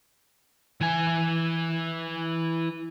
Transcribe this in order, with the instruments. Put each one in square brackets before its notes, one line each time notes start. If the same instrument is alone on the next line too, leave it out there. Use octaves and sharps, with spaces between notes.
[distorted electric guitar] E3 G#5